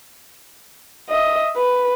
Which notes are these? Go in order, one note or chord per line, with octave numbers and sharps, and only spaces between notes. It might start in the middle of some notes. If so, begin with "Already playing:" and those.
D#5 E5
B4